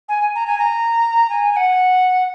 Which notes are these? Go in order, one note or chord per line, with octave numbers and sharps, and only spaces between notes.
G#5
A#5
G#5
A#5
G#5
G#5
F#5